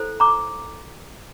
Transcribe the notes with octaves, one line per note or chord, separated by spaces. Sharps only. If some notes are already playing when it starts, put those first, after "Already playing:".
Already playing: E4 A4 C5
A#5 D6